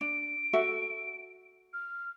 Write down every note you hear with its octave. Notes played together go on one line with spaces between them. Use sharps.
D4 D7
F#4 A4 E5
F6